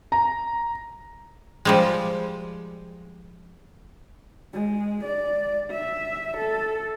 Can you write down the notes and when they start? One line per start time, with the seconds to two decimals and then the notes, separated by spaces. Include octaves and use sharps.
0.12 A#5
1.65 F3 G3 G#3
4.54 G#3
5.04 D5
5.71 E5
6.38 A4